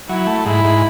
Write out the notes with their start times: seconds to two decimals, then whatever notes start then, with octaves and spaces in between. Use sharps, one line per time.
0.09 F#3 E4
0.27 A3
0.45 G#2 E4
0.64 G#2